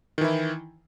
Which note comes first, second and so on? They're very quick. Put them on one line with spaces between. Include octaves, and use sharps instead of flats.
D#3 E3 E4